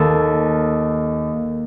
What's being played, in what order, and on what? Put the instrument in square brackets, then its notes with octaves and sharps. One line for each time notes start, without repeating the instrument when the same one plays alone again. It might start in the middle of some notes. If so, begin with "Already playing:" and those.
Already playing: [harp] D#2 D#3 A4